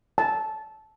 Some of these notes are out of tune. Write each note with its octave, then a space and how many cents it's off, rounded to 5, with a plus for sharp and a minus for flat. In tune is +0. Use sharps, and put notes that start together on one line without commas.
A5 -20